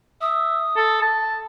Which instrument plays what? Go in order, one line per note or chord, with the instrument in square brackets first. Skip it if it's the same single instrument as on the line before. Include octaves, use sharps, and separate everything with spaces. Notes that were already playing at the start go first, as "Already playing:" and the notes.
[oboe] E5 [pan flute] D#6
[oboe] A4
A5